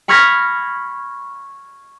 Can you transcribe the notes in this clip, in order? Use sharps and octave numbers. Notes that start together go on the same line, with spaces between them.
B5 C#6 F6 G#6 A#6 B6